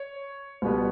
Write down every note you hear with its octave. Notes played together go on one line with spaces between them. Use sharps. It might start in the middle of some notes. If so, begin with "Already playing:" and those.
Already playing: C#5
C#2 B2 G3 B3